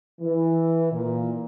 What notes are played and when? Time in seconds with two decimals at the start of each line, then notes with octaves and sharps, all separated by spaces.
0.21 E3
0.92 A#2